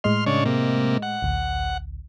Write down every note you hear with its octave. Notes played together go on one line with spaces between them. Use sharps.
A2 G#3 D#5 C6 F6
C#3 D4 C#5
C3 A#3
F#5
A1 D2